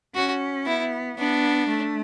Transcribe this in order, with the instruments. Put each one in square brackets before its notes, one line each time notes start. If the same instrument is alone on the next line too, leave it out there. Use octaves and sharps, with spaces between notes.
[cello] C#4 [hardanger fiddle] F#4
[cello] B3 [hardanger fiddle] E4
[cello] B3 [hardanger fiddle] D4
[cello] A3